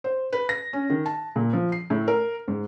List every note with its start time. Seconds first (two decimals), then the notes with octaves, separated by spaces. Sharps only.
0.04 C5
0.33 B4
0.49 A#6
0.73 C#4
0.90 D#3
1.06 A5
1.36 A#2
1.53 F3
1.72 C7
1.90 A2
2.08 A#4
2.48 G#2